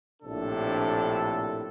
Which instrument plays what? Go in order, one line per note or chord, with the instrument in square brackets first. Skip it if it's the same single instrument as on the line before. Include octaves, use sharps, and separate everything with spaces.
[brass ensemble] A#1 A2 C3 D4 A4